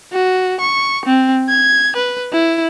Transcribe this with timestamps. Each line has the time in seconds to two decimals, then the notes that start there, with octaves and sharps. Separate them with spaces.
0.12 F#4
0.60 C#6
1.05 C4
1.48 G#6
1.96 B4
2.32 E4